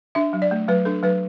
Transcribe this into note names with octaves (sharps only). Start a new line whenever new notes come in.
D4 E5
F#3
D5
A3
F#3 B4
D4 A4
F#3 B4